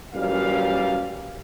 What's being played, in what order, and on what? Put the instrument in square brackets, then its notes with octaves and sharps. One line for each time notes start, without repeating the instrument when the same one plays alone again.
[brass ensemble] A1 F#2 A#2 G3 F5